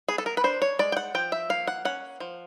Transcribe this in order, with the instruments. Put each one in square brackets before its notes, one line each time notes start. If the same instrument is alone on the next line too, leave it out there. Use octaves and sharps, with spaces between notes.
[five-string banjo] B3 G#4
A4
A#4
B4
D4 C5
C#5
G#3 D5
G5
F#5
F3 G5
E5
A#3 F5
F#5
C#4 F#5
F3